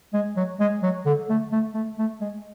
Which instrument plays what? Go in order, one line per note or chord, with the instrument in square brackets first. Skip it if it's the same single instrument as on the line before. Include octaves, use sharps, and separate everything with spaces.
[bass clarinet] G#3
F#3
G#3
F#3
D3
A3
A3
A3
A3
G#3